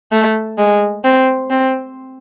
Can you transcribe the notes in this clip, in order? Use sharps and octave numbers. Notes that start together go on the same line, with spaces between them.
A3
G#3
C4
C4